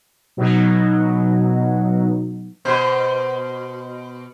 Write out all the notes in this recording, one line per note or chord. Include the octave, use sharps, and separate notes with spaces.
B2 F#3 D#4
B2 C5